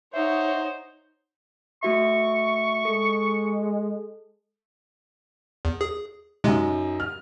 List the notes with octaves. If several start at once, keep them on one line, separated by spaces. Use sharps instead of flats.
D#4 C5 C#5 E5 F#5
A3 F#4 E5 C#6
G#3 A4
E2
G#4
F#2 C3 G#3 D#4
F6